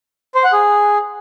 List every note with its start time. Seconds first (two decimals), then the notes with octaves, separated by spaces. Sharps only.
0.35 C5
0.44 F#5
0.53 G#4